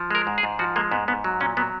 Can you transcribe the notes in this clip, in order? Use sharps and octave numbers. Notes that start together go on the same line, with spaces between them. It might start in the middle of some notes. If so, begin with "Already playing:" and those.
Already playing: F3
G#3 A#4
G#2
G#4
G#2
F3 F#4
G#3 A#3
G#2 B3
G#2 B3
F#3
A#2 C#4
F#3 B3